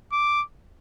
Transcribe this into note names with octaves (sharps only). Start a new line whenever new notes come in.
D6